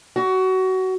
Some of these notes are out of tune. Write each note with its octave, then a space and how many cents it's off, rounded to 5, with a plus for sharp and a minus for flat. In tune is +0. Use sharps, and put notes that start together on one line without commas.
F#4 +20